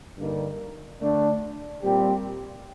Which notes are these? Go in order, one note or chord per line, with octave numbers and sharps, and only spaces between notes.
G2 D3 G3 A#3 D#4
D3 A3 D4
A#2 G3 C4 G4